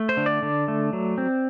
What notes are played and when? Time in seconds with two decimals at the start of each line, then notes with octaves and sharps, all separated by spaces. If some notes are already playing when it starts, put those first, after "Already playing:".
Already playing: A3
0.09 C5
0.17 D3
0.26 D5
0.43 D3
0.68 A3
0.93 F#3
1.18 C4